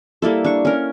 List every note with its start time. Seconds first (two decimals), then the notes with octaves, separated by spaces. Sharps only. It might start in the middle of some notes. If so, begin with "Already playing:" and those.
0.22 G3 A#3 E4 A4
0.44 D4 C#6
0.65 C#4 A#4